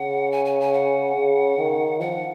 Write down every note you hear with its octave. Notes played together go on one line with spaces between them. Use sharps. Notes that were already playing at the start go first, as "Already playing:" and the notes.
Already playing: C#3 F#5
G#5
G#5
G#5
F#5
C#3
D#3
F3 F#5